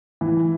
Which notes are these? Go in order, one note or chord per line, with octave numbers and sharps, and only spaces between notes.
E3